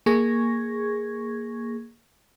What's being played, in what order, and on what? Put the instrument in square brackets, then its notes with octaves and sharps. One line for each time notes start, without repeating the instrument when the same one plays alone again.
[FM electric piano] A#3 G#4 C#6 G#6 A#6